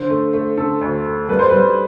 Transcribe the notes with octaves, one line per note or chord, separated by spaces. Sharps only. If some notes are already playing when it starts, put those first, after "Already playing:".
Already playing: D3 C5
A3
A3
D3 A4
D2
A3
G3 B4
C5
G3 B4